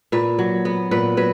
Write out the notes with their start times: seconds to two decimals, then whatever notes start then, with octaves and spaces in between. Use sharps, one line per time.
0.12 A#2 B4
0.39 F#3
0.65 B3
0.91 A#2 B4
1.17 F#3 B4